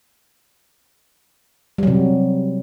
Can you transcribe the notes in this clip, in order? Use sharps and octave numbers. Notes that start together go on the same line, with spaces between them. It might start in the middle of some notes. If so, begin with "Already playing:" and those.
C3 F#3 G3